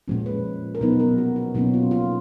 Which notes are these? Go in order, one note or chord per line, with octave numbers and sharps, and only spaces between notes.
A#2 F3 G#3 C#4
B4
A#4
B2 F#3 B3 D#4 B4
A#4
F#4
F#4
B2 F#3 A#3 C#4 D#4
F4
F4